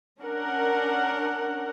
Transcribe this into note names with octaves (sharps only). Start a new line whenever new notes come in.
C#4 D4 A#4 F#5